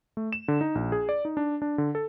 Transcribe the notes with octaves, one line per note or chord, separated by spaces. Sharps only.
A3
E7
D3
D#4
A#1
G#4
D5
D#4
D4
D4
D3
A4